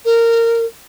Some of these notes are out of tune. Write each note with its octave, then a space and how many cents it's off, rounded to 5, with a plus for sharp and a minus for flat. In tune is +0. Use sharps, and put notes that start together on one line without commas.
A#4 -15